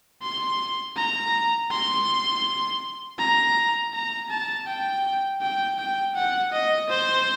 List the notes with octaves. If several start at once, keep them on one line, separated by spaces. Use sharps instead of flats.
C6
A#5
C6
A#5
A#5
A5
G5
G5
G5
F#5
D#5
C5